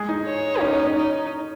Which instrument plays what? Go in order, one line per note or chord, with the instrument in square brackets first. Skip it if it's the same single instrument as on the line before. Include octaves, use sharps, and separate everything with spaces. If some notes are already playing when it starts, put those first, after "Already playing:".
Already playing: [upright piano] G#3 G#4
D#4
[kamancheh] C#5
[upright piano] C#4 [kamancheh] D#4
[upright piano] C#4
C#4
[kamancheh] D#4